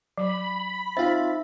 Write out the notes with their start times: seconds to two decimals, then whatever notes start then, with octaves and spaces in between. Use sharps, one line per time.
0.18 F#3 B5
0.97 C4 D#4 F4 E5 A6